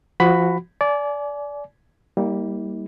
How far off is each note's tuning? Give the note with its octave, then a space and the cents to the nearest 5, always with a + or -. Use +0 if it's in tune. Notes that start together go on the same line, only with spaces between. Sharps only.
F3 -20 F#4 +0 B5 +10
D5 -20 G#5 +35
G3 +0 A#3 +0 D#4 +45